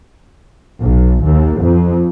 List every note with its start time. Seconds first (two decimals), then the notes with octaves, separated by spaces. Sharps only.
0.81 B1
1.24 D#2
1.62 F2